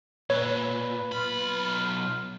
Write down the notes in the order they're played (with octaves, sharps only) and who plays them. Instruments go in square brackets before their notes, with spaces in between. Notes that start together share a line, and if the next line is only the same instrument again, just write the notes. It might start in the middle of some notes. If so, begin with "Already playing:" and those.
[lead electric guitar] A#2 [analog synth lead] B4 [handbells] C#5
[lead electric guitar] B1 B5 [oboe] F4